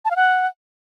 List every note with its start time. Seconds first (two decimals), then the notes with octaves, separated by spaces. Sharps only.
0.05 A5
0.10 F5
0.16 F#5